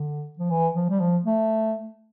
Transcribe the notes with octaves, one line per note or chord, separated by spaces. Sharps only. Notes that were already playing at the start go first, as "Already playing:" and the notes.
Already playing: D3
F3
E3
F3
G3
F3
A3